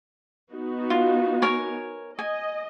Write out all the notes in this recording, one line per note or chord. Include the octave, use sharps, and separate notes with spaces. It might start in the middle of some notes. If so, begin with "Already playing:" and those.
B3 D#4 F#4
F4
A#4 C#5 G#5
D#5 G#5